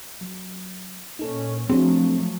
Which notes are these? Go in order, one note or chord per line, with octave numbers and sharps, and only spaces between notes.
F#3
A#2 C#4 D#4 A4
F3 F#3 A3 C4 D4 F#4 G#4